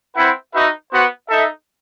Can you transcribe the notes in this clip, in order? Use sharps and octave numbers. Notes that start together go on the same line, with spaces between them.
C4 E4 B4 F#5
D#4 F#4 B4 E5
B3 F#4 C5 F#5
D#4 A4 E5